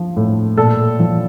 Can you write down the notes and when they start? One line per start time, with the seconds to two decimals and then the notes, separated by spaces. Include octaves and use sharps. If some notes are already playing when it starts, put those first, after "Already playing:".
Already playing: F3
0.17 A2
0.57 A#2 A4
0.99 F3